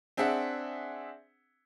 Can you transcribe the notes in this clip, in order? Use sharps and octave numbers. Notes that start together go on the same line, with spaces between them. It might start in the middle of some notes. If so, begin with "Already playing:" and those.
C4 D4 G#4 E5 F#5